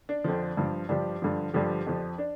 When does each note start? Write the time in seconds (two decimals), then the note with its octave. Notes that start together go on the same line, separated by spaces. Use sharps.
0.09 D4
0.24 F2 D3 F3
0.57 G2 F3
0.89 G2 F3 D4 G4
1.22 G2 D3 F3
1.54 G2 D3 F3 D4 G4
1.87 F2 F3
2.18 D4